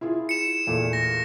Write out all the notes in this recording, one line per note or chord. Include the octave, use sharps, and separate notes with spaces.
E4 F4 G#4
C#7 E7
E2 A#2 A3
A#6